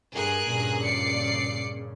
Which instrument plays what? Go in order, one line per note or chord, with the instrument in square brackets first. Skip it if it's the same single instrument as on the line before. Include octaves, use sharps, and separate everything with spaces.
[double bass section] G2 [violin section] G#4 A#4 F#6
[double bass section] G2 A#2 C#3
[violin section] D5 C7 C#7